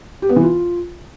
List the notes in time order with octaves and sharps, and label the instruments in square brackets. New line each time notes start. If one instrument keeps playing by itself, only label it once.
[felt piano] G4
B3
E3
F4